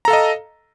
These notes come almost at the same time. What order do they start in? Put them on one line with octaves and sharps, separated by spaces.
A#5 A4 F5 D#5